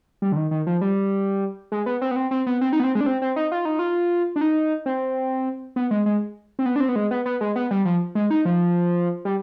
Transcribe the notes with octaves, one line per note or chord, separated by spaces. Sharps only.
G3
D3
D#3
D#3
F3
G3
G#3
B3
C4
B3
C4
C4
B3
C4
D#4
B3
C4
G#3
D4
C4
C4
D#4
F4
D#4
F4
D4
D#4
C4
B3
G#3
G#3
C4
B3
D4
C4
B3
G#3
B3
B3
G#3
B3
G3
F3
G#3
D#4
F3
G3